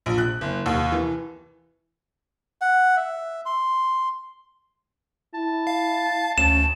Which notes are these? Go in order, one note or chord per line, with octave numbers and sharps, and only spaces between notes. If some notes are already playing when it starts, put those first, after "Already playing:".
A#1
F#6
F#1
D#2
E3
F#5
E5
C6
E4 A5
F5
D2 C#4 E7